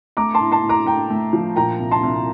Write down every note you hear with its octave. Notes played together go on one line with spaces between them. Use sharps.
A3 A#5 D6
A5 C6
A2
A5 C6
A2
A#5 D6
A3 G5 A#5
A3
F3
A#2 G5 A#5
C2
A5 C6
C2